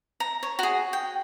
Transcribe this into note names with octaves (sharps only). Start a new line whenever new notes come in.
A#5
C#5
F#4 G#4
G5